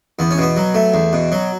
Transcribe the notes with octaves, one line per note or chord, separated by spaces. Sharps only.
E2 B3
C#4
B2 B3
F#3
A3
E2
B2
F#3